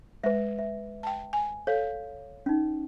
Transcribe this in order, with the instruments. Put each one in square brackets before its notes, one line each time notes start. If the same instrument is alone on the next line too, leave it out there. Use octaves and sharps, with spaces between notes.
[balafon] G#3 [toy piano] B4 E5
[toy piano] E5
[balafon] G5 A5
G#5
[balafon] A4 [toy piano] C#5 F5
[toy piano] C#4 D#4